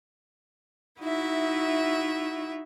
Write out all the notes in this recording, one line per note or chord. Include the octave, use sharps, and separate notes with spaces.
D#4 E4 F#4 E5